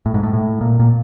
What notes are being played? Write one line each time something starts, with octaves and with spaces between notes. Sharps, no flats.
A2
G#2
A2
A2
A#2
A#2